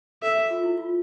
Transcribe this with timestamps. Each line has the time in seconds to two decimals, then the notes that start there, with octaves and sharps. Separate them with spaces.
0.22 A4 E5
0.37 G#4
0.50 F4
0.63 E4
0.78 F4